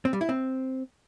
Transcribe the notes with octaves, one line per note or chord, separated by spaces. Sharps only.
C4
G3
E4
C4